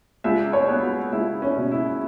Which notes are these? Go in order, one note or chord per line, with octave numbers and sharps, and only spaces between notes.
C#2 E5
C#5
B3
F#4
C#2 E4
C#4
B2
E4